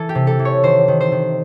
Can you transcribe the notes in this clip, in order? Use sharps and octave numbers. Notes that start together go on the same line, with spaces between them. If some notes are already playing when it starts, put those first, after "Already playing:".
Already playing: E3 A4
G4
C3
A4
E3
C#5
D#3 C5
D#3
C5
D#3